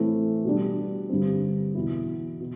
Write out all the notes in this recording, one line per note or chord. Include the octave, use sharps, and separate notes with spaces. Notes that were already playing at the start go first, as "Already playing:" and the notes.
Already playing: A2 E3 A3 C4 E4
B2 G3 D4
G2 D3 G3 C4
E2 B2 B3 E4
B2